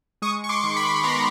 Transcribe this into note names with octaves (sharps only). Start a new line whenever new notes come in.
G#3 C#6 D#6
C#6
C6 D6
D#3
B5 C#6
B3 A#5 C6